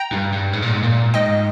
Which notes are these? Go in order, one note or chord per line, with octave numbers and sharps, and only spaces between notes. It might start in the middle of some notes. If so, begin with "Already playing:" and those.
Already playing: G5 A#5
G2
G2
G#2
A#2
G#2
A#2
G#2 D#5 G5